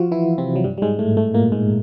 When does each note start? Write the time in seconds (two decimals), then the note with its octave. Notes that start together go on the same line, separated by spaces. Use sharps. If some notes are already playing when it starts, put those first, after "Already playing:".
Already playing: F3 F4 F#4
0.11 E3 E4
0.38 C3 C4
0.56 F#3
0.64 G2 G3
0.78 G3
0.82 G#2 G#3
0.99 A2 A3
1.17 A2 A3
1.34 A#2 A#3
1.52 G#2 G#3